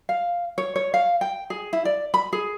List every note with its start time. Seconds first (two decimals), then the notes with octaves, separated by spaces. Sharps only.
0.09 F5
0.58 C#5
0.76 C#5
0.94 F5
1.21 G5
1.50 G#4
1.73 E4
1.85 D5
2.14 B5
2.33 G#4